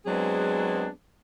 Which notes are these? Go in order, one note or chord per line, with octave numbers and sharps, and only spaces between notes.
F#3 G#3 B3 C4 D4 G#4